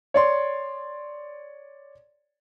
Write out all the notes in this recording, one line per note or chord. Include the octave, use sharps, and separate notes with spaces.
C#5 D5 C6